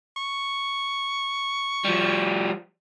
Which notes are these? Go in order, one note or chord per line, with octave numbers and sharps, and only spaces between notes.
C#6
F3 G3